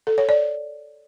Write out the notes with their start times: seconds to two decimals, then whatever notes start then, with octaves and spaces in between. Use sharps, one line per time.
0.07 A4
0.18 C#5
0.29 D5